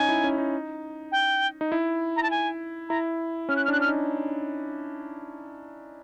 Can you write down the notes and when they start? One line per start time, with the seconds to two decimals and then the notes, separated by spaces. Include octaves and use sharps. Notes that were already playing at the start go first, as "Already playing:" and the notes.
Already playing: C#4 D#4 G#5
0.09 E4
0.24 C#4
0.38 D#4
1.12 G5
1.61 D#4
1.72 E4
2.16 A#5
2.23 A5
2.31 G#5
2.89 E4 A#5
3.49 C#4 F6
3.56 F#6
3.65 F6
3.68 D4 F#6
3.81 F6
3.88 D#4